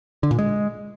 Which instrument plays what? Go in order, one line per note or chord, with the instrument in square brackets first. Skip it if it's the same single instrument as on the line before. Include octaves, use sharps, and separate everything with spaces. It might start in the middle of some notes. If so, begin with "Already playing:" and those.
[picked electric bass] D3
A#2
G#3